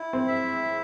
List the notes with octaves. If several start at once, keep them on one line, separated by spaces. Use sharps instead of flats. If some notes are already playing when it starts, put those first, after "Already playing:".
Already playing: E4
C4
E5